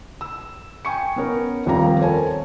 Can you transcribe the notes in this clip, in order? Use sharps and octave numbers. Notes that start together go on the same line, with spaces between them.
E6
G5 G#5 C#6 C#7
B3 C#4 A#4
D#1 F2 G3 F4 A#5
A4 A#4 C5 C#5 G#5 A5